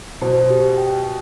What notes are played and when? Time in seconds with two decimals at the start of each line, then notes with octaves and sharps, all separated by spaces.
0.21 B2 C5
0.51 G4
0.78 G5